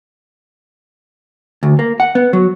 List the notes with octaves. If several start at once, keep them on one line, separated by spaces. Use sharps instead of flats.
D2
A#3
F#5
B3
F#3